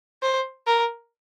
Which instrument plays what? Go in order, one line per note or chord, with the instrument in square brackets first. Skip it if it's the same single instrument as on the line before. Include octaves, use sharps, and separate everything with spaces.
[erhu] C5
A#4